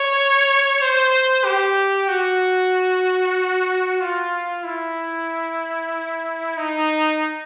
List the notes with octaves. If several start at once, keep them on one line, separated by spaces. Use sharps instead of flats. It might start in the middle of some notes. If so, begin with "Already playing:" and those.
Already playing: C#5
C5
G4
F#4
F4
E4
D#4